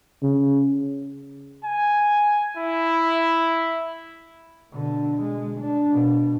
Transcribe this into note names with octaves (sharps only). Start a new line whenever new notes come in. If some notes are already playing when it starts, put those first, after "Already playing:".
C#3
G#5
E4
B2 D3
G#3
D4
B2